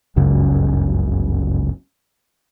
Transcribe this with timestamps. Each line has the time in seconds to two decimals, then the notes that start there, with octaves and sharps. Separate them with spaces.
0.16 G1 C#2 F#2 C#3